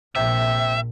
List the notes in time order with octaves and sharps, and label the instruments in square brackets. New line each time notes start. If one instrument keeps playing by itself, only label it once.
[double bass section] A#1 [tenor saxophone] C3 [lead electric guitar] E5